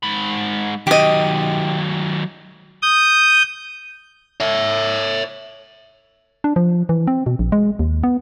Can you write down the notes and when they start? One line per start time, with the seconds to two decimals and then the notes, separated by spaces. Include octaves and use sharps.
0.03 G#2 B5
0.87 D#3 F#3 G4 D#5
2.82 D#6 G6
4.40 C#5 E5
6.44 D4
6.56 F3
6.89 E3
7.07 C4
7.26 B2
7.39 A#1
7.52 G#3
7.79 D#2
8.03 B3